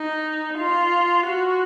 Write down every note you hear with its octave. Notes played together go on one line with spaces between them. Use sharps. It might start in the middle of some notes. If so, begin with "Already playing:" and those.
Already playing: D#4
F4
F#4